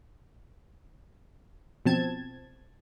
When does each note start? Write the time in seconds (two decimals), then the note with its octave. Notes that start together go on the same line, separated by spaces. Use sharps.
1.85 B2 F3 C4 A5 G#6